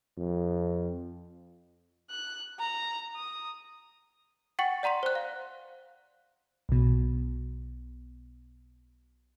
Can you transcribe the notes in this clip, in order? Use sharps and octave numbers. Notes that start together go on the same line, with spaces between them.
F2
F#6
A#5
D#6
F#5 G5 C#6 A6 C#7 F#7
D5 F#5 A#5 C6 B6
C5 F#6
F5
B1 B2